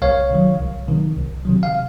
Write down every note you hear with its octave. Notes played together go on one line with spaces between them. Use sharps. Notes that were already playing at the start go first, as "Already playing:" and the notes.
C2 C#5 F5
C3 D#3 F#3
C2
C3 D#3 F#3
C2
C3 D#3 F#3
F5